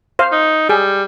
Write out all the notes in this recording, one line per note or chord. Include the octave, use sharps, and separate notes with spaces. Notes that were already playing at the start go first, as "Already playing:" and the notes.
C5 F5
D#4
G3 G#4